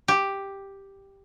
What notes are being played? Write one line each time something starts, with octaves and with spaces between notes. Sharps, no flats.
G4